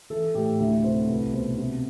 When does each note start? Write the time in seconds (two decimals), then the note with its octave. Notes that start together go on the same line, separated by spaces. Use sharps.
0.10 E3 A4
0.35 A2 G4
0.59 D2 E4
0.84 C3 C5
1.09 C2 B4
1.34 B2 C5
1.58 C3